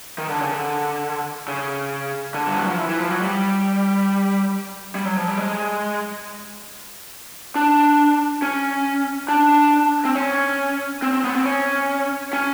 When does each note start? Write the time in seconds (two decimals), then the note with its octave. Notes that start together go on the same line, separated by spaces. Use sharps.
0.18 D#3
0.29 D3
0.40 C#3
0.52 D3
1.48 C#3
2.34 D3
2.47 G3
2.57 F#3
2.68 F3
2.78 E3
2.89 E3
3.00 F3
3.10 F#3
3.22 G3
4.95 G3
5.05 F#3
5.17 F3
5.28 G3
5.38 G#3
7.55 D4
8.42 C#4
9.28 D4
10.05 C4
10.15 C#4
11.02 C4
11.13 C4
11.24 B3
11.35 C4
11.45 C#4
12.33 C#4